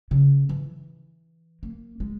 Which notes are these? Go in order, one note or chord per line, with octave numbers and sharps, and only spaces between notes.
C#3
E3
A#3
G#3